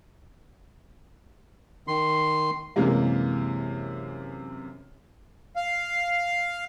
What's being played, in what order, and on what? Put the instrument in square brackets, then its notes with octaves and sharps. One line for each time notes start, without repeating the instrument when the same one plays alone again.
[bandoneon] D#3 C6
[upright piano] F#2 C3 E3 G#3 A#3
[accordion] F5